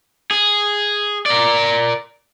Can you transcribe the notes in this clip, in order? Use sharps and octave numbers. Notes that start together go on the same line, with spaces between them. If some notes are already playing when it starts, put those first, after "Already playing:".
G#4
A#4 D5